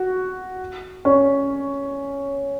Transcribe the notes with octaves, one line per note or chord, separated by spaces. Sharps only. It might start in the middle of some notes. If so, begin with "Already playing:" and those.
Already playing: F#4
C#4